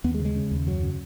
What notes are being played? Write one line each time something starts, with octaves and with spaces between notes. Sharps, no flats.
D#2 B3
G#3
C#3
G#3
C#3
D#2
F#2 F#3
C#3